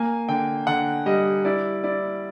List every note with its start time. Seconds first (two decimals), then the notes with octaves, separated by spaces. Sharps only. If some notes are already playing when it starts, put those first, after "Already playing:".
Already playing: A#3 G#5
0.29 D3 G5
0.67 D3 F#5
1.06 G3 D#5
1.45 E4 D5
1.84 E4 D5